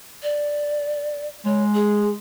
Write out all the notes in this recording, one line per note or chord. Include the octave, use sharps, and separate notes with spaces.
D5
G#3 C#5
G#4